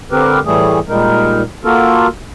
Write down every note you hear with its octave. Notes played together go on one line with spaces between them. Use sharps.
D3 C4 G4 A#4 B4
A2 E3 G3 A3 G#4
A#2 G3 G#3 D#4 A#4
A#3 F4 F#4 A4 A#4